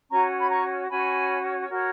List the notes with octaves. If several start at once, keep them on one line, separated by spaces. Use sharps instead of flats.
C#4 F#4 C#5 A#5 C#6
B5
A#5 C#6
C#4 F#4 C#5 G#5 B5
F#4 A#4 C#5